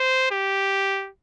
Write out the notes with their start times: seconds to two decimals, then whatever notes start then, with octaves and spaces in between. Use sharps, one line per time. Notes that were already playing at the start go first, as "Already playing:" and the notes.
Already playing: C5
0.31 G4